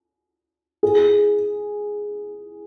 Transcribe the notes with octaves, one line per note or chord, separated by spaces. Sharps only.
G#4